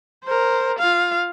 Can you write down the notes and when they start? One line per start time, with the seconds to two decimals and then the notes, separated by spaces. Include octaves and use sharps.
0.24 A#4 C5
0.79 F4 F5